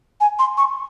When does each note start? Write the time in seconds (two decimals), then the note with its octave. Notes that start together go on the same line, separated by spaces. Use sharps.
0.21 G#5
0.39 C6
0.57 C#6